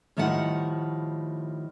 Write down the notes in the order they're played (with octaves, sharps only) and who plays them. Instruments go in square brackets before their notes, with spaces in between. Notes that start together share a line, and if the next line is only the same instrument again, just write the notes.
[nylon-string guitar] A2 D#3 F3 G3 F#5